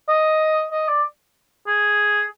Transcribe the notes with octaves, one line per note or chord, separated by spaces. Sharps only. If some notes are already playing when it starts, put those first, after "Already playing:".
D#5
D#5
D5
G#4